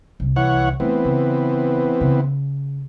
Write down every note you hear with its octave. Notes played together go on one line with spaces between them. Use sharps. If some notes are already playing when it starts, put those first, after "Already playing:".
C2
E3 C#5 F#5
E3 A3 B3 C4
C#3
C#3